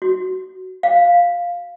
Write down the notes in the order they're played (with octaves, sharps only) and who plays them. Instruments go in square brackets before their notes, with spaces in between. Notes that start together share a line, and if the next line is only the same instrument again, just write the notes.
[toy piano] F#4
F5